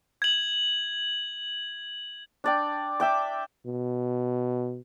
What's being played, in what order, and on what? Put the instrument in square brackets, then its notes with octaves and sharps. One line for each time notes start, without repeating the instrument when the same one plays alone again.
[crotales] G#6 F#7
[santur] D4 D5 G5
E5 G5 D6
[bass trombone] B2